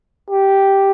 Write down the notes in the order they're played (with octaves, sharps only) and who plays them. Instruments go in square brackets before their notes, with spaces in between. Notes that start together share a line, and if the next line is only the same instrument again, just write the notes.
[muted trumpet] G4